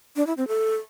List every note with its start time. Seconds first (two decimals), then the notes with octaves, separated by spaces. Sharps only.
0.16 D4
0.27 E4
0.37 C4
0.48 A4